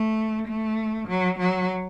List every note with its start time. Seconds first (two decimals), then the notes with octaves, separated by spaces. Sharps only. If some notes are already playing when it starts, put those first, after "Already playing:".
Already playing: A3
0.46 A3
1.08 F#3
1.38 F#3